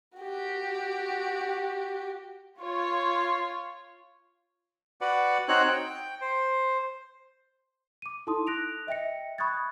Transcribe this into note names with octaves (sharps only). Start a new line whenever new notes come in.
F#4 G4
F4 C#5
F#4 B4 D5 F#5
C4 D#4 F#4 C#5 F#6
G5
C5
D6 D#7
D#4 E4 A4 A5 C6 D#6
F#6 A#6 D7 F7
D#5 E5 G5 A#6 C#7
B5 C#6 D#6 F#6 G#6 A6